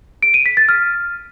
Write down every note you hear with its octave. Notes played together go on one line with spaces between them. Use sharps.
D7
D#7
B6
A6
F6